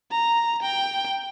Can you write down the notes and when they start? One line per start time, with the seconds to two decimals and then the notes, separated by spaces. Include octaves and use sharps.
0.11 A#5
0.62 G5